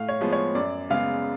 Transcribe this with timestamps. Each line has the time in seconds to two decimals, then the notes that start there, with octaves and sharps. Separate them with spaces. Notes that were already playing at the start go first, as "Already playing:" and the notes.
Already playing: A2 F5
0.09 C#5
0.21 F3 G#3 B3
0.33 C#5
0.55 F#2 D5
0.90 C#3 G#3 B3 F5